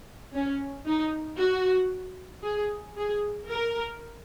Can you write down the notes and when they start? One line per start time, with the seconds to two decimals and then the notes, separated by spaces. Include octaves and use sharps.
0.34 C#4
0.87 D#4
1.39 F#4
2.44 G#4
2.97 G#4
3.49 A#4